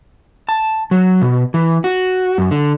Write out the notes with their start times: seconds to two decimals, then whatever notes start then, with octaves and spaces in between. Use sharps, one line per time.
0.49 A5
0.91 F#3
1.22 B2
1.54 E3
1.84 F#4
2.38 F#2
2.51 D3